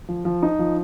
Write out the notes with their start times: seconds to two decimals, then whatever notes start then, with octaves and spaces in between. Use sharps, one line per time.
0.09 F3
0.25 F3
0.43 D#4
0.59 F3